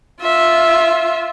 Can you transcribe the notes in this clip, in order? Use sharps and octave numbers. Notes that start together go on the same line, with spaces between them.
F4 E5